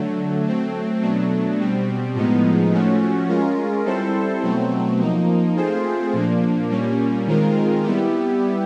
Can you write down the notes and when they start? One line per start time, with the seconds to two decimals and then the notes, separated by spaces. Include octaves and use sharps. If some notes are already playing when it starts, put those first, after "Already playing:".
Already playing: D3 F#3 A3
0.44 F#3 A3 C4
1.01 B2 F#3 A3 D4
1.58 B2 G3 C4
2.15 A2 F3 G#3 B3 D#4
2.72 F3 A3 C#4 F#4
3.28 G#3 C#4 F4 A#4
3.85 G3 C4 E4 A4 C5
4.42 B2 F#3 A3 C4
4.99 F3 A#3 D#4
5.56 A3 C4 F4 G#4 C5
6.13 A#2 F3 A#3 D4
6.69 A#2 G3 A#3 C#4
7.27 D#3 G#3 C4 F4 A#4
7.83 G3 B3 E4 G4